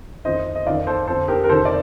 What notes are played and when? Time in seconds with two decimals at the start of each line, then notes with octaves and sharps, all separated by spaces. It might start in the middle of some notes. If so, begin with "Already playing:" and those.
0.25 F2 D#3 C5 D#5
0.55 D#5
0.67 F2 D#3 D5 F5
0.87 A4 C5
1.07 F2 D3 A4 C5
1.28 G4 A#4
1.44 A#4
1.49 F2 C3 D#3 A4 C5
1.65 D5